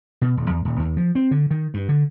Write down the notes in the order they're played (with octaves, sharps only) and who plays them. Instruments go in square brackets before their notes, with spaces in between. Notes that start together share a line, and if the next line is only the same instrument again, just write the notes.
[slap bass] B2
D#1
E2
D#1
D#2
F3
C4
D3
D#3
G2
D3